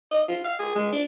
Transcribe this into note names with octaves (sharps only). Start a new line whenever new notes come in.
D#5
F4
F5
G#4
G#3
D4